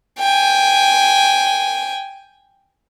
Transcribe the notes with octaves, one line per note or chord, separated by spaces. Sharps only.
G5 G#5